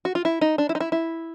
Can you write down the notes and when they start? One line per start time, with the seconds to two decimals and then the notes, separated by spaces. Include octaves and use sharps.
0.05 F#4
0.15 F4
0.25 E4
0.41 D#4
0.58 D4
0.69 E4
0.75 D#4
0.80 E4
0.92 E4